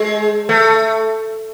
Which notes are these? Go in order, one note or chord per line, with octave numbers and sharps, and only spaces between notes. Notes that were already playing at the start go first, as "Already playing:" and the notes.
Already playing: G#3
A3